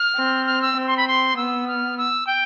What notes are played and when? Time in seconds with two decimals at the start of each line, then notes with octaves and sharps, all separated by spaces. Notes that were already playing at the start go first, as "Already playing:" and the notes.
Already playing: F6
0.16 C4
0.46 F6
0.62 E6
0.77 C4
0.87 C6
0.97 B5
1.08 C6
1.37 B3 E6
1.68 F6
1.98 E6
2.27 G5